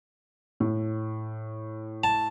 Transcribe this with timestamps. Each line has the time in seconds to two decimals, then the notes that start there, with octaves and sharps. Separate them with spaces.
0.60 A2
2.04 A5